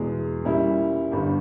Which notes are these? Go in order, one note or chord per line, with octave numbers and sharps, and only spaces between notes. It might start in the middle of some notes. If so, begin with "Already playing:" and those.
Already playing: E2 B2 G#3
A#2 G3 C#4 E4
G1 G2 G3